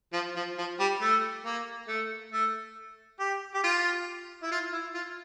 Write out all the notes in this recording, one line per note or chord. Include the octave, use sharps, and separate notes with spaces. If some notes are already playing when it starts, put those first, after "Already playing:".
F3
F3
F3
G3
A3
A#3
A3
A3
G4
G4
F4
E4
F4
E4
F4